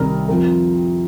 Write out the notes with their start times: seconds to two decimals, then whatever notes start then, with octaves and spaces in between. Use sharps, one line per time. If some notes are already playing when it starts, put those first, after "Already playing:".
Already playing: C2 C3 D#3 G3 A#4
0.28 F2 F3 A#4